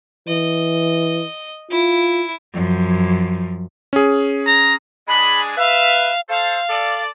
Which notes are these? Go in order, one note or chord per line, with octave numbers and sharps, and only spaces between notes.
E3 D#5
E4 F4
F#2 F3
C#4 G#4
A#5
G#3 D4 G#4 B5
B4 E5 F5
A4 C5 F5
A4 D5